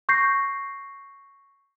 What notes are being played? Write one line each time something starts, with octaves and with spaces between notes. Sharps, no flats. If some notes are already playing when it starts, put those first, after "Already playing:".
C#6 G6 A#6 C7